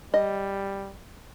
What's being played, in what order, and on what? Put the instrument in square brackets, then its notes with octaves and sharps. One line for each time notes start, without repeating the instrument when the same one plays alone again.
[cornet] G3 [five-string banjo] D#5